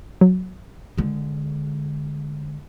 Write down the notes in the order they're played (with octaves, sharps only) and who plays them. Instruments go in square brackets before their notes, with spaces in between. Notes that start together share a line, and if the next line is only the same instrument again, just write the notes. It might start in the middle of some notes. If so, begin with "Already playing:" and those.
[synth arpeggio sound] F#3
[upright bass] D3 G#3